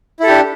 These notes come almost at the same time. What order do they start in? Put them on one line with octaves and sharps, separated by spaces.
E4 A4 G4 D4